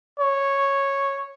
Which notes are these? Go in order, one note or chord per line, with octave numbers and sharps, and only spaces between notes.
C#5